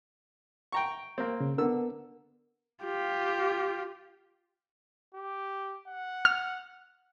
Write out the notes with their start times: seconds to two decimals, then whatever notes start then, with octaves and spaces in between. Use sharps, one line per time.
0.72 G5 A#5 C#6
1.18 A#3 C4
1.41 C#3
1.58 D3 B3 A#4 E6
2.85 F4 G4
5.15 G4
5.88 F#5
6.25 F6